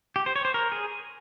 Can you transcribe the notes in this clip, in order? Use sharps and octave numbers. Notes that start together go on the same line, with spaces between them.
G4
C5
C#5
C5
A#4
G#4